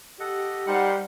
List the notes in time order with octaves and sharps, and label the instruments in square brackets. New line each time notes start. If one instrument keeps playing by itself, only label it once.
[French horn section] G4 [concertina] A4 D#5 F#5
[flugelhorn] G3 [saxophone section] D#4 C5 F#5 [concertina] A#4 C6